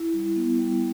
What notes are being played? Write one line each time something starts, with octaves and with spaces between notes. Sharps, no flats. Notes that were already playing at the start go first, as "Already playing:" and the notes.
Already playing: E4
G3
B3
G3